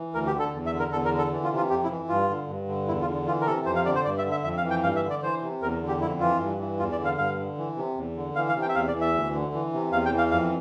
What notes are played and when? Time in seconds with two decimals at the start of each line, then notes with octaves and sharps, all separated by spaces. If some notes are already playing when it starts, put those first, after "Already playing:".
Already playing: E3
0.14 D2 A#4
0.27 G4
0.34 D3
0.39 A4
0.53 E2
0.66 E5
0.73 D3
0.79 A#4
0.92 E2 A4
1.05 A#4
1.11 D3
1.18 A4
1.32 E3
1.44 F4
1.51 C3
1.57 F4
1.70 F2 G4
1.83 E4
1.90 E3
2.09 G2 F4
2.29 D3
2.48 G2
2.68 D3
2.87 E2 E4
3.01 F4
3.08 D3
3.26 E3 F4
3.41 A#4
3.47 C3 A4
3.66 F2 C5
3.75 F5
3.85 D3 D5
3.95 C5
4.05 G2 D5
4.18 E5
4.24 D3
4.31 E5
4.44 F2 E5
4.57 F5
4.64 E3
4.70 G5
4.83 G2 F5
4.96 E5
5.03 D3
5.10 D5
5.23 E3 C5
5.42 C3
5.62 E2 A#4
5.82 D3
5.88 G4
6.01 F2 E4
6.20 E3 F4
6.41 G2
6.59 E3
6.79 E2 F4
6.92 D5
6.99 D3
7.05 F5
7.18 G2 F5
7.38 D3
7.58 E3
7.77 C3
7.97 E2
8.16 D3
8.35 E3 F5
8.49 F5
8.55 C3
8.62 G5
8.69 E5
8.75 E2 F5
8.88 D5
8.94 E3
9.01 E5
9.14 D2
9.33 D3
9.53 E3
9.73 C3
9.92 E2 F5
10.06 G5
10.12 E3
10.18 F5
10.31 F2 F5